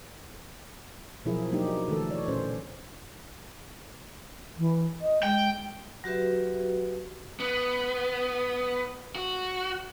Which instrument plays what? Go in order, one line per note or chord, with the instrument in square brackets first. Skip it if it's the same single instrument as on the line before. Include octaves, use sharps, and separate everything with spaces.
[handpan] B2 F3 F#3 E4 G#4 A#4
F#3 A#3 D4 D#4 G4
D3 E3 A3 A4
C#5 D5
A#2 C#4 C5
[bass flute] E3
D#5
[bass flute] G#3 [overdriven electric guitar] G5
[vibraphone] F#3 F#4 G4 B4 E5
[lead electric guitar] B3
F#4